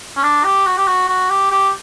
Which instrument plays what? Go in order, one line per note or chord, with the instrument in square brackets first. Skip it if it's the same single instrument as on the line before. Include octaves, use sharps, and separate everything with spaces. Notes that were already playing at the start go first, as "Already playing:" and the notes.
[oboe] C#4
D4
G4
F#4
G4
F#4
F#4
G4
G4